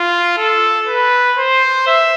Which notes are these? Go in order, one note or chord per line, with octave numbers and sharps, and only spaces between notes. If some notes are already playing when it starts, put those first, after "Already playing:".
Already playing: F4
A4
B4
C5
E5